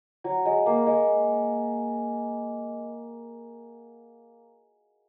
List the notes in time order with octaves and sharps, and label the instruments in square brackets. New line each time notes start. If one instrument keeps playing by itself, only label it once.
[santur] F#3
G#3
A#3
G#3